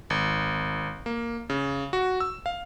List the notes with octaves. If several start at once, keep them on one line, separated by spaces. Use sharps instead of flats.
G#1
A#3
C#3
F#4
E6
F5